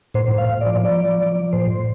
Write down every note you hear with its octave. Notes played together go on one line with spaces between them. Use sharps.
A2 C5
A2
F5
A2
F3 D5
F3 D5
F3
F3
F3
A2 C5
A2